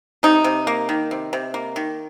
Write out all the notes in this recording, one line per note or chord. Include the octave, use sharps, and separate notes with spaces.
C3 D#4
C3
A#3
D#3
C3
C3
A#3
D#3